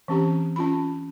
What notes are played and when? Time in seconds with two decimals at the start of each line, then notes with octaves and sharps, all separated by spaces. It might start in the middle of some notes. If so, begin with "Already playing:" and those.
0.08 E3 C4 C#4 G4 A#5
0.56 C#4 F4 B5